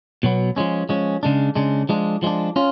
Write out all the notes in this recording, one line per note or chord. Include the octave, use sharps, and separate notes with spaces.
B2 F#3 B3
F3 G#3 C#4
F3 G#3 C#4
C#3 G#3 D4
C#3 G#3 D4
F3 G#3 D4
F3 G#3 D4
C#4 F4